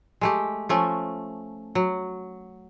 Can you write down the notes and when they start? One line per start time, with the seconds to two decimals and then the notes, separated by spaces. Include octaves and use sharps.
0.21 G#3 A3 G4
0.69 F3 A3 C#4
1.75 F#3